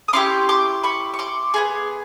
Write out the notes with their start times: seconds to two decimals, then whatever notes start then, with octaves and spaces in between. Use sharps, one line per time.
0.08 D#6
0.13 C#4 E4 G4 C6 D6
0.49 C6 D6
0.84 B5 C#6
1.14 C#6
1.19 C6 D6
1.54 B3 D#4 G#4